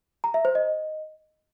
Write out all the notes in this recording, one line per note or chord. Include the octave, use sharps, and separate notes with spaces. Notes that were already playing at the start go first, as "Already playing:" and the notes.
A#5
E5
C5
D#5